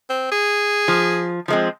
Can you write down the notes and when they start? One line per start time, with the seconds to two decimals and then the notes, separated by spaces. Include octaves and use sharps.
0.10 C4
0.32 G#4
0.88 F3
1.48 F3 G#3 C4